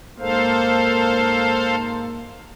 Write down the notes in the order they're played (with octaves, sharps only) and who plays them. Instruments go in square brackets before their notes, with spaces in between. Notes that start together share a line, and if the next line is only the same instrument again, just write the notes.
[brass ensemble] G#2 A#3 [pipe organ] A4 C5 F5